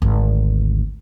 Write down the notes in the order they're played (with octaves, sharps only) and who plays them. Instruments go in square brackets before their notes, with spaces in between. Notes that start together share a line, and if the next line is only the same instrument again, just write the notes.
[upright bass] G#1 D2